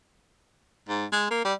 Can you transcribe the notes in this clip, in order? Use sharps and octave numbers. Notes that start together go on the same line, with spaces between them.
G#2
G#3
A#3
G3